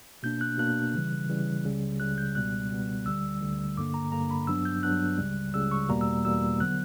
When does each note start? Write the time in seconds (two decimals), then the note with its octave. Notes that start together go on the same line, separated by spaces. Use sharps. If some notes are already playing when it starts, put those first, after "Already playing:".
0.23 B2 A#3 D4 G6
0.41 F#6
0.58 B2 A#3 D4 F#6
0.94 C#3 E3 G3
1.29 C#3 E3 G3
1.64 C#2 C#3 G3
2.00 C#2 C#3 G3 F#6
2.18 G6
2.35 C#2 B2 G3 B3 F#6
2.71 C#2 B2 G3 B3
3.06 D2 D3 G3 E6
3.42 D2 D3 G3
3.77 G2 D3 A#3 D6
3.94 A#5
4.12 G2 D3 A#3 A#5
4.31 B5
4.47 G2 F#3 B3 D4 E6
4.65 G6
4.83 G2 F#3 B3 D4 F#6
5.18 C#2 C#3 G3
5.53 C#2 C#3 G3 E6
5.71 C#6
5.89 E2 B2 G3 A#3 A#5
6.01 E6
6.25 E2 B2 G3 A#3 E6
6.60 D3 F#3 B3 F#6